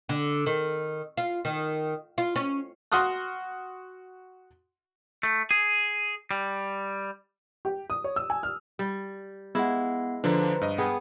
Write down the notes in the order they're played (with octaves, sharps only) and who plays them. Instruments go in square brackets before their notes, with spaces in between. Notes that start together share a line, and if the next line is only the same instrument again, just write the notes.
[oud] D3
D#3
F4
D#3
F4
C#4
[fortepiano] F#4 C6 D#6 F6 F#6
[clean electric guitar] A3
G#4
G3
[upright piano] G4
D#6
C#5
E6
G#5
F6
[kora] G3
[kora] G#3 E4 [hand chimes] B3 F#5
[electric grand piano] D3 F3 D4 [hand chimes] B4 C5 A#5
[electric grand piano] G2 D#5
[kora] B3 G#4 [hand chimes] G5